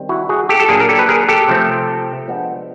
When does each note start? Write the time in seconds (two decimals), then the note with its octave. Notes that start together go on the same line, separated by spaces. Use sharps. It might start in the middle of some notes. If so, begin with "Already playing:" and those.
Already playing: D#3 G3 C4
0.09 E4 F#4
0.29 F#4 G#4
0.49 G4 A4
0.60 A4
0.69 A#2 F#3 A#3 D4 G#4 A#4
0.80 A#4
0.89 G4 A4
0.99 B4
1.09 G#4 A#4
1.28 G4 A4
1.48 C3 F3 A3 C4
2.28 F3 G#3 B3 D4